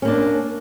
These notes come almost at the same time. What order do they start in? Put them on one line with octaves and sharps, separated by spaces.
C#4 A#3 D4